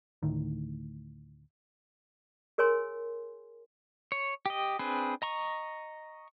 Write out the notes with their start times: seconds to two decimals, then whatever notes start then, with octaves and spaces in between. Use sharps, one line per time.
0.23 D2 A2 D#3
2.58 G#4 A#4 C#5 G#5 C6
4.12 C#5
4.46 G4 D#5
4.79 C4 D4 G#4 B4
5.22 D#5 A#5 C#6